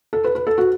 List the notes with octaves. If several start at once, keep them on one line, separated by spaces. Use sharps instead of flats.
A4
B4
B4
A4
F#4